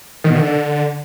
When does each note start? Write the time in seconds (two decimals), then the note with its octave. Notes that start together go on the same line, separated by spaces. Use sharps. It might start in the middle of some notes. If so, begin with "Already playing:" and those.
0.24 D#3
0.30 B2
0.35 D#3
0.41 D3